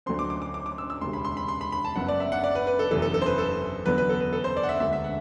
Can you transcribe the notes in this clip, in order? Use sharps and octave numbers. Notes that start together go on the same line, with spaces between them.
D2 D3 F#3 A3 C4 C6
D6
D6
D6
D6
D6
E6
E6
E1 D2 C3 C6
B5
C6
B5
C6
B5
B5
A5
F#1 F#2 F#3 B3 F#5
D5
E5
F#5
D5
B4
B4
A4
F#1 E2 C3 E3 A4
A4
A4
C5
B4
A4
E2 D3 F#3 B3 B4
B4
A4
B4
A4
C5
D5
F#5
E5
E1 D2 D3 E5
E5
F#5